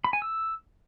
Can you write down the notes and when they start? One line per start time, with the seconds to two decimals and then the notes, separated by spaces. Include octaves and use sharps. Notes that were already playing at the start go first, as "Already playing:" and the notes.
0.04 B5
0.13 G#5
0.22 E6